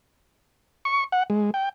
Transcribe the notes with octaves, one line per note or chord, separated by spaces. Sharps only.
C#6
F#5
G#3
G5